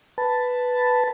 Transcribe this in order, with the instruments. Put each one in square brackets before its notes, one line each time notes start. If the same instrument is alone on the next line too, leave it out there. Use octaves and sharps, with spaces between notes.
[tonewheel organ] B4 A5